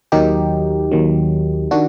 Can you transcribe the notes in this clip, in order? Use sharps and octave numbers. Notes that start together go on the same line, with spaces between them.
D#2 D#3 F#3 D#4 G4
D#2 D#3 F#3
D#3 D4 F#4